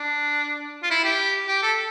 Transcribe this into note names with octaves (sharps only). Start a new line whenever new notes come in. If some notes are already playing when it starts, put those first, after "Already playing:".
Already playing: D4
F4
E4
G4
G4
A4